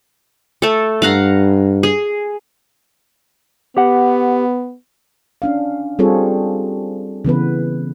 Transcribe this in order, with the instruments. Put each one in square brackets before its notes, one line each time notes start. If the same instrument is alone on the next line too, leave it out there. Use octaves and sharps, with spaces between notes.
[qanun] A3 A4
[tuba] G2 [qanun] F5 F#5 A#5
[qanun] G#4
[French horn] B3 [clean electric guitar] G4 F#5
[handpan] C#4 D4 F5
G3 C4 F4 G#4 A4 C#5
C#3 E3 B3 B4